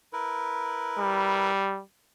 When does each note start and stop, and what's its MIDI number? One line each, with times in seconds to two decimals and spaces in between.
0.13 1.51 64
0.13 1.51 70
0.13 1.51 71
0.99 1.81 55